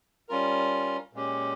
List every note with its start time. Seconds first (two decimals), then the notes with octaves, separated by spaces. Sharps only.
0.29 G3 C#4 F4 A#4
1.13 A#2 G#3 C#4 G4